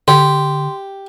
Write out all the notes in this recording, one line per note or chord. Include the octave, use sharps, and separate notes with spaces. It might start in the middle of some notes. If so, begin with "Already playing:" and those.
D3 G4 C6